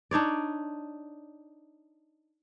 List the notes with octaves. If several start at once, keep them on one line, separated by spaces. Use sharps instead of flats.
D4 D#4 C#5 D5